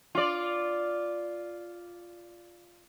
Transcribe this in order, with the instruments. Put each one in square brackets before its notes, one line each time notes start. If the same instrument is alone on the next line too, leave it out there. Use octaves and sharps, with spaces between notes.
[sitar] F4 D5